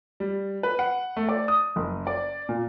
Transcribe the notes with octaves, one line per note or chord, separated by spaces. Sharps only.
G3
B4
F#5
A3
D5
D#6
F#1
D5
A#2